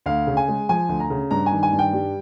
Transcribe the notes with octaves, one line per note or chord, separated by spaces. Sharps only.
D2 F5
C#3
G#5
G#3
F3 G#5
D2
A#5
C#3
G2 A#5
G#5
D#3
G#5
G2
G5
G3